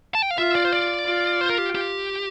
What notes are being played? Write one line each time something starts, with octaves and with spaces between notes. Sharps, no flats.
A5
G5
F5
F4 E5
D5
C5
D5
F4
C5
A#4
G4
G4